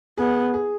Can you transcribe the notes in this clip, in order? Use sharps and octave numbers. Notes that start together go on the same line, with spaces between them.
B3 G#4
G#4